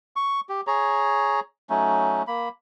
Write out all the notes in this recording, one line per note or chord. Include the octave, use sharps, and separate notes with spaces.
C#6
G4
G#4 C#5 A#5
F#3 A3 C#4 D#4
A#3 B5